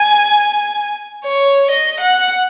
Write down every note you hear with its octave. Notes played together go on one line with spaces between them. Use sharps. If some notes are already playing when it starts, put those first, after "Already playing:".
Already playing: G#5
C#5
D#5
F#5